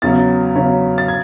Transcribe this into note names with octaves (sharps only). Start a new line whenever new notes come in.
E2 C#3 F#3 C#4 A6
E2 C#3 F#3 C#4
A6
G#6